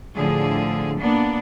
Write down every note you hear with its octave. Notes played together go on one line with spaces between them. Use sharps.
A2 D3 F3 G#4
A#2 A#3 B3 D4